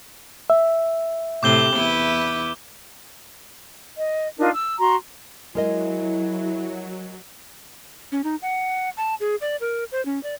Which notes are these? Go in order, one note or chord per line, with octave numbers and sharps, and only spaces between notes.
E5
A2 C3 D6 G6 G7
E2 E4 B4
D#5
D4 D#4 F4 A#4
E6
F#4 A#5 C6
F#3 G#3 E4 A#4 D#5
C#4
D#4
F#5
A5
G#4
D5
A#4
C5
C#4
D5